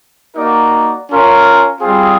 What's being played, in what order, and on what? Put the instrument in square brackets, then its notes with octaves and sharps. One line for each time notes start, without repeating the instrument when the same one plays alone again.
[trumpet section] A#3 D#4 F#4 A#4 D5
C#4 F4 A#4
G3 C4 F4 G#4